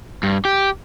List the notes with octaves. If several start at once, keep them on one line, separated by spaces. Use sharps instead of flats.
G2
G4